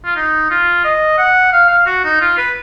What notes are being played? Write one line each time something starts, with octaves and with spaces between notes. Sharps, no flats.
F4
D#4
F4
D#5
F#5
F5
F5
F#4
D#4
F4
B4